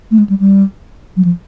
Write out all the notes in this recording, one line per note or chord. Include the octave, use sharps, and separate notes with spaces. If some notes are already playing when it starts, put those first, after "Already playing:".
A3
G#3
G3
G3
F#3
F3